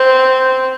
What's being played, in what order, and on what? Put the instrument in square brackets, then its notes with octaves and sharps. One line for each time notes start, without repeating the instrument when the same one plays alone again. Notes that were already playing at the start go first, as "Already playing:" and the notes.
Already playing: [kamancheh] C4